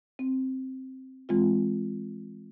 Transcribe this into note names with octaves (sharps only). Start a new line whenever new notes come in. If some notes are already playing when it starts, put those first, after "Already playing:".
C4
E3 G#3 C4 F4